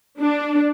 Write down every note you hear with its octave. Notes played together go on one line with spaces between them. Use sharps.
D4